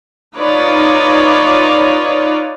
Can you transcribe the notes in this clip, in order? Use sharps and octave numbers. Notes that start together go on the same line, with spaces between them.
D#4 F4 B4 C#5 D5